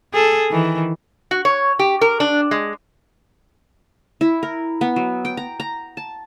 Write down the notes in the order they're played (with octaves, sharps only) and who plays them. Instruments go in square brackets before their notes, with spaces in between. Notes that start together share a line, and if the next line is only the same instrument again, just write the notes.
[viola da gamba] G#4 A4
D#3 E3
[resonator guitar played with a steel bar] F#4
C#5
G4
A#4
D4
G#3
[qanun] E4
A#4
B3
F#3
G5
A#5
A#5
A5